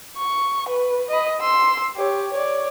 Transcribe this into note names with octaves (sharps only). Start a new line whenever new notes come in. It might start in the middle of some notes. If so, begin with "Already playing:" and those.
C#6
B4
D#5 B5
C6 E6
G4 C#5
C#5 D5